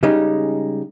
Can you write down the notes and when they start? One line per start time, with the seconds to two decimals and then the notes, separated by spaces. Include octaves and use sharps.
0.03 C#3 G3 G#3 C#4 D#4